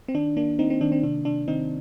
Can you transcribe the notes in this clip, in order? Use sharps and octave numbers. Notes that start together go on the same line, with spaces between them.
C4
D#3 D4
A#3 D4
A#3 C4 D#4
C4
D#3 D4
C4
C3 D4
C3 D4
D#3 C4 D#4